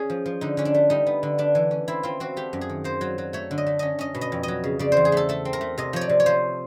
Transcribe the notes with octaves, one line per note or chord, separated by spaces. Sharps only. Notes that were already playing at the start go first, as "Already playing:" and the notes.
Already playing: C#4 G#4
F3
F3
D3 D#4
D3 C#4
D4
A3
G3 D#4
B3
D3
A3 D4
E3
C#4
C4 E4
C4 F4
C4 F#4
A3 G4
F#2
G#4
D#3
A#3 C5
F#3
F#3
A3 C#5
D3
D#5
A3
C#4 D#5
C#4 D#5
B2
D#5
F2
F#3 D#5
C#3
C#3 D5
E2 C5
G#4
A3 A4
A3 A4
C4
A#4
A3
C3 D#5
F3 C#5
D5
C3
C#5
F3 C5